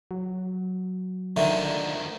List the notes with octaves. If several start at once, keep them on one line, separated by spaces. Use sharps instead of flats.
F#3
D2 D3 D#3 F3 E5